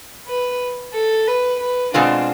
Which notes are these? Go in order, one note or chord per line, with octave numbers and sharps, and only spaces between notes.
B4
A4
B4
B4
B2 G#3 C4 D4 F4